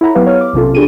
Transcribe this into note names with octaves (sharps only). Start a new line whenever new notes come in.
E4 A4 C#5 F#5 A#5 B5
F#3 B3 G4 B4 F5
C#5 F6
D6
B1 C3 C#4 F4 A4
D4 G4 G#4 D7 D#7